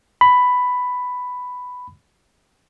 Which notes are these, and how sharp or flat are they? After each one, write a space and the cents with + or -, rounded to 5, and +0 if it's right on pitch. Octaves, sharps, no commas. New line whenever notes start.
B5 +5